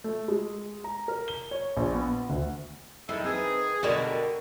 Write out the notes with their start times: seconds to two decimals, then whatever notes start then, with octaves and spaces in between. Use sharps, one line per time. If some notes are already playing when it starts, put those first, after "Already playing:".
0.04 A3
0.28 G#3
0.84 A#5
1.08 A#4
1.28 G7
1.51 C#5
1.77 A#1
1.94 B3
2.29 D2
3.09 D#3 G3 G#3 E4 A4
3.24 C4 G#4 B4
3.83 B2 D3 G3 G#3 F#4 A#4